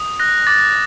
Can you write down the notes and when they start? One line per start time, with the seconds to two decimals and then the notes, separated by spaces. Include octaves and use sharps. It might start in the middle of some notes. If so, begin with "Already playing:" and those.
Already playing: D#6
0.20 F#6 A#6
0.47 D6 A6